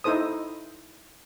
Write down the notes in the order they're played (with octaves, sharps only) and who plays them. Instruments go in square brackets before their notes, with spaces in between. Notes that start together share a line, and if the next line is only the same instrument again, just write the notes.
[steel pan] D#4 E4 A4 C5 D#6